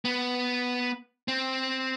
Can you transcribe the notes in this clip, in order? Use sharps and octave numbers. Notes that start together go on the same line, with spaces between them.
B3
C4